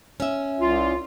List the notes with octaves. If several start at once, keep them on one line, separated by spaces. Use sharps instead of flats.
C#4 E5
C2 F4